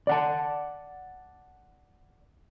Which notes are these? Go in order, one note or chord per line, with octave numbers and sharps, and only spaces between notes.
D5 F#5 A5